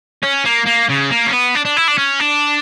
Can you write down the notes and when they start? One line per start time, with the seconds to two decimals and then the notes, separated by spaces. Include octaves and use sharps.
0.24 C#4
0.46 A#3
0.67 A#3
0.90 C#3
1.11 A#3
1.26 C#4
1.33 B3
1.55 D4
1.65 D4
1.77 E4
1.88 D4
1.98 C#4
2.20 D4